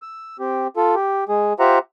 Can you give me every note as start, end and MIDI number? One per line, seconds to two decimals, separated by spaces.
0.02 0.37 88
0.39 0.67 60
0.39 0.67 67
0.77 0.95 65
0.77 0.95 69
0.95 1.24 67
1.29 1.53 56
1.29 1.53 68
1.60 1.79 65
1.60 1.79 67
1.60 1.79 72
1.60 1.79 76
1.60 1.79 78
1.60 1.79 82